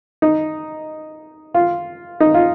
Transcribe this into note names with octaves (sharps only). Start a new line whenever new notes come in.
D#4
F4
D#4
F4